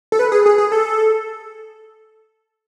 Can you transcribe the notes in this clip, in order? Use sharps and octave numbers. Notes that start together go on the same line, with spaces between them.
A4
B4
G#4
G#4
G#4
A4